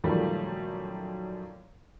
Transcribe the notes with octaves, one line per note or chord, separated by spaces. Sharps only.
F#2 A#2 D#3 F3 G3 A3